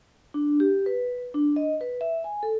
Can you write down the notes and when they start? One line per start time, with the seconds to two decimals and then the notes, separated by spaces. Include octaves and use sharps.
0.34 D4
0.60 G4
0.86 B4
1.34 D4
1.56 D#5
1.81 B4
2.01 E5
2.24 G#5
2.43 A4